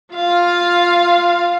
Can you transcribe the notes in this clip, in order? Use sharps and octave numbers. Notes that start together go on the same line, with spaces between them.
F4 F5